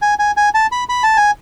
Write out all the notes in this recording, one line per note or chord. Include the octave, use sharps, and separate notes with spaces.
G#5
G#5
G#5
A5
B5
B5
A5
G#5